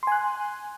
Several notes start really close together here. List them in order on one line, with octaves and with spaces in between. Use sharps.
C6 G#5 F#6